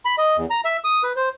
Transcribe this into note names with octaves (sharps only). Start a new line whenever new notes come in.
B5
D#5
E2
A#5
E5
D#6
B4
C5